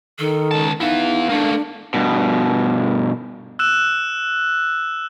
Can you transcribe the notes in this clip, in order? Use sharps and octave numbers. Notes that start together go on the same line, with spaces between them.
D#3 A4
C#2 A5
B3 D#4 E4 F5
A3 A#3 D4
G2 B2
E6 F#6 E7